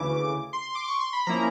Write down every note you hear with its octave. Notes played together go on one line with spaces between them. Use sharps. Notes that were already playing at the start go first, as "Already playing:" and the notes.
Already playing: D2 C#3 E3 D6
C6
D6
C#6
C6
B5
F3 A#3 C#4 E4 A#5